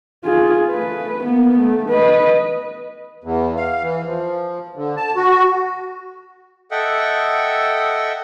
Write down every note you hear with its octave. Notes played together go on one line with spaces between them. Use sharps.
F4 G#4
A3 B4
A#3 B3
A3
B4 D#5
E2
F5
E3
F3
D3
A5
F#4
A4 D#5 E5 F#5 G5